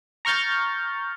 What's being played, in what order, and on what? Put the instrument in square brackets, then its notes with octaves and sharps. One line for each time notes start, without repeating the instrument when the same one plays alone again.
[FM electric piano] A#5 C#6 F6 G6 A6